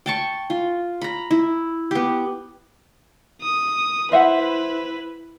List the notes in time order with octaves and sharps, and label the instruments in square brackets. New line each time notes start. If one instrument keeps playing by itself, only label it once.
[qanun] G5 A5 C#6
F4
A#5 B5
E4
B3 G4
[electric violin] D#6
[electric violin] E4 B4 [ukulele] C5 E5 F#5